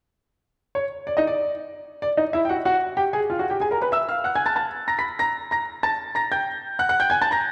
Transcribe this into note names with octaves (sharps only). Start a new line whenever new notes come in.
C#5
D5
D#4 D#5
D5
D5
D#4 D#5
E4 E5
G5
F#4 F#5
F#4 F#5
G4 G5
G#4 G#5
F4 F5
F#4 F#5
G4 G5
G#4 G#5
A#4 A#5
B4 B5
E5 E6
F5 F6
F#5 F#6
G#5 G#6
A5 A6
A5 A6
A#5 A#6
B5 B6
A#5 A#6
A#5 A#6
A5 A6
A#5 A#6
G5 G6
F#5 F#6
F#5 F#6
G5 G6
G#5 G#6
A5 A6
A#5 A#6